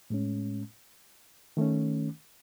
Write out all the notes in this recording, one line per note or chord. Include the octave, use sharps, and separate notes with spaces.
A2 G#3 C#4
D#3 A3 C#4